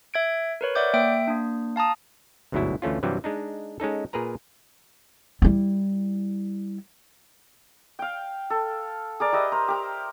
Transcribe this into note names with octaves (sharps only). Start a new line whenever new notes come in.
E5 G#6 D7
A#4 B4 C#5
D5 E5 F#5 D6 G6
A#3 E5 G5 D7
A#3 D4
F5 A5 A#5 D#6
G1 D2 G#2 B2 F#3 E4
D2 E3 A3 C#4 F4
G2 C3 E3 F#3 G3
G#3 D4 D#4
G#3 C#4 D#4 A4
A#2 G#4 A#4 B4 A#5
G3 E4
F5 G5
A4
G#4 A#4 D5
G4 B4 D#5 E5
A#4 C5
G4 A#4